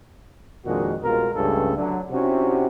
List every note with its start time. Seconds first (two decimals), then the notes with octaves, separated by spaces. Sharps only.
0.66 F2 A#2 D#3 G#3 D4 F#4
1.03 C2 B2 G#3 F4 A#4
1.34 C#2 G2 C#3 A3 C#4 A4
1.77 D3 F#3
2.11 C3 C#4 D4 E4 F#4 G4